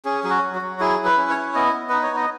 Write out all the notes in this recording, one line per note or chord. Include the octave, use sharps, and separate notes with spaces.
C#4 G#4
F#3 G#4
F#4
F#3
F#4
F#3
E4 G#4
E4
B4
C#4
C#5
E4
B3 D#5
B3
D#4 B4
C#5
B3 D#5